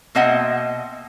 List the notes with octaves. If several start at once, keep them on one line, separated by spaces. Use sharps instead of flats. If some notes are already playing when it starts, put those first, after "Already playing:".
B2 A#3 C4 D#5 E5 F#5